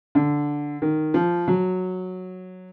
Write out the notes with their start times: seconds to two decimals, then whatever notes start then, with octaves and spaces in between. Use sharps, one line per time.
0.15 D3
0.82 D#3
1.14 F3
1.48 F#3